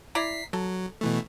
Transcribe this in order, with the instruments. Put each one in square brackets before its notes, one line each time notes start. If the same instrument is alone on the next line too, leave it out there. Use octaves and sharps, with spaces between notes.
[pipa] E4 D5 A#5 [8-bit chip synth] B6 C7
[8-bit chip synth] F#3 [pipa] A4
[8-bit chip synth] B2 E3 A3